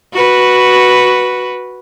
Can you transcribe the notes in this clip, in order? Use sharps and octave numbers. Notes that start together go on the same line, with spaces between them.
F#4 B4